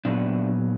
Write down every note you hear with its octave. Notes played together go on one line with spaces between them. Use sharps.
A#2 F#3 B3 D4